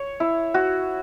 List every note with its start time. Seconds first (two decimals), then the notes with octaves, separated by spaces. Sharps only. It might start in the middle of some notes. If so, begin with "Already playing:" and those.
Already playing: C#5
0.20 E4
0.54 F#4